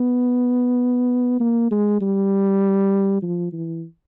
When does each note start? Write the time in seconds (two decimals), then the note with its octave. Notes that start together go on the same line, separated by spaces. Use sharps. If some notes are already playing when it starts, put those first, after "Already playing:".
Already playing: B3
1.40 A#3
1.71 G#3
2.01 G3
3.22 F3
3.53 E3